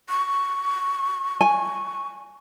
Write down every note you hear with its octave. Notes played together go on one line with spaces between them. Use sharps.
C#6
G#5